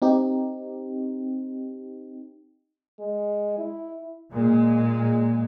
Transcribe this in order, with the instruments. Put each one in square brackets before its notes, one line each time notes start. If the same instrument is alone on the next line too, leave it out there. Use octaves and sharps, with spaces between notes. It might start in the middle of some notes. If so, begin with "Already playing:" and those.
[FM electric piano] C4 D#4 G4
[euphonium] G#3
E4
[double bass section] A#2 G#3